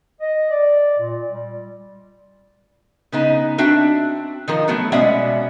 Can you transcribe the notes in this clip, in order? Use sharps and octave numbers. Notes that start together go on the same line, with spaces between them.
D#5
D5
A#2
G3
C#3 B3 D#4
C4 D4 F#4 E5 G5
D#3 F3 A#4
F#3 A3 B3 F#4
B2 G#3 C#4 D5 E5 F#5